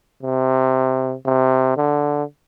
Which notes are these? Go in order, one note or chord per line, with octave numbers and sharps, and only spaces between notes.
C3
C3
D3